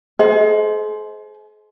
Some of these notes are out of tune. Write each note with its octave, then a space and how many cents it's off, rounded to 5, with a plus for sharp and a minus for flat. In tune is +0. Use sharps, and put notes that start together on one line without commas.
G#4 +45 C5 +0 D#5 +25